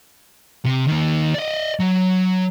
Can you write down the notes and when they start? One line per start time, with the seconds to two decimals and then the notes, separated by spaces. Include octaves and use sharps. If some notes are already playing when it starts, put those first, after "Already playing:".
0.65 C3
0.87 D#3 A#3
1.34 D5 D#5
1.80 F#3